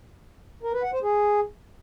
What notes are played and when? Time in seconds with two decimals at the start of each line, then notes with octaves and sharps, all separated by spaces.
0.63 A#4
0.73 B4
0.83 F#5
0.93 C5
1.03 G#4